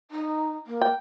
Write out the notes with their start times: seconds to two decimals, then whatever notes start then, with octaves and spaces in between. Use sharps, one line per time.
0.11 D#4
0.67 A#3
0.81 G5